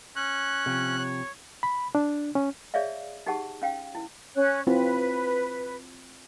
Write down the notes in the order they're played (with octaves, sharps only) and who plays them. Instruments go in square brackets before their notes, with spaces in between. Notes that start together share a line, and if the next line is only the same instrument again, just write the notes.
[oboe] C#4 [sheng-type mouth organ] F#6
[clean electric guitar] C3 F3
[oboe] C#5
[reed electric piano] B5
D4
C#4
[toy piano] G#4 C#5 D5 E5 F5
D#4 G4 G#4 F#5 A5
C#4 F5 G5
E4
[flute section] C#4 C#5 F#6
[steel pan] C4 E4 F4 [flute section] B4